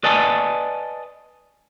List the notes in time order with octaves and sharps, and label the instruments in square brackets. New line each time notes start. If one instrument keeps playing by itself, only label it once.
[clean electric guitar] B4 D5 D#5 G#5 A5